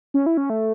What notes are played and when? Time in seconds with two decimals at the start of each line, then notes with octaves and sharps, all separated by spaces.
0.14 C#4
0.26 E4
0.37 C#4
0.50 A3